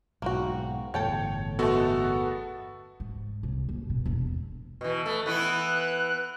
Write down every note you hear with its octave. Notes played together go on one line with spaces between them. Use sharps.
B1 G#2 A#3 C4 F#4
G1 E2 A2 A4 C#5 G5 A5
G#3 A3 B3 F#4 A4
G#2
C2
F#1
B2
E1
B2 E3
A3
E3 B3 E4 F#6